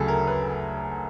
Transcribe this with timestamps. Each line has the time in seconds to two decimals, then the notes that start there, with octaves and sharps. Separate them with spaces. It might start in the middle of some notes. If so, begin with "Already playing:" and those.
Already playing: D2 C#3 F#3 G#4 A4
0.08 A#4
0.28 B4